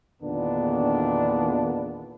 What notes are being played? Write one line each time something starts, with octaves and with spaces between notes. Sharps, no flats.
E2 A#2 D3 D#3 B3 D4